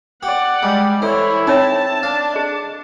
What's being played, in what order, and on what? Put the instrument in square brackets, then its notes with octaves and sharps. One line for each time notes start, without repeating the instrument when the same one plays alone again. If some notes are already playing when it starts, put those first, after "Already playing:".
[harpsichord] G4 [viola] D5 F#5
[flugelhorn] G3 [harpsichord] G#3
[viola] E3 C#5 [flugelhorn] E4 [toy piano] A4 D6 [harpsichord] C5
[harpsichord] C4 [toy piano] D#4 C#5 E5 [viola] A5
[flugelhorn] D4 [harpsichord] F5
[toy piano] G#4 D#5